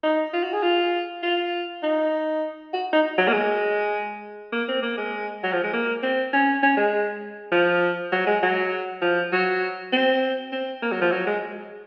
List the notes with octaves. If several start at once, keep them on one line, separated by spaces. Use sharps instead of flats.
D#4
F4
F#4
G#4
F4
F4
D#4
F#4
D#4
F#3
A#3
G#3
A#3
C4
A#3
G#3
F#3
F3
G#3
A#3
C4
C#4
C#4
G#3
F3
F#3
G#3
F#3
F3
F#3
C4
C4
A#3
F#3
F3
F#3
G#3